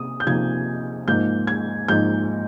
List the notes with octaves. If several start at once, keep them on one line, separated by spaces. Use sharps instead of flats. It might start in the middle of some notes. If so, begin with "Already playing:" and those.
Already playing: C3 A#3 D#6
G6
C3 F3 A#3 D#4 G#6
G#2 F3 A#3 D#4 G6
G#6
G#2 F3 A#3 D#4 G6